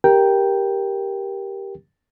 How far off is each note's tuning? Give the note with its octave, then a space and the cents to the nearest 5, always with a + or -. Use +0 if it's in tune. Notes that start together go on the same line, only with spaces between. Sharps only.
G4 +0 A#4 +10 G5 +0